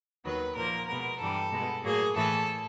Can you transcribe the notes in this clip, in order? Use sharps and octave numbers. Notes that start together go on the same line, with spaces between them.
D#2 D#3 F#3 B3 B4
A#2 F3 A#3 A#4
B2 G#3 B3 A#4
G2 E3 G3 A4
B2 G#3 B3
A2 F#3 A#3 G#4
A2 E3 A3 A4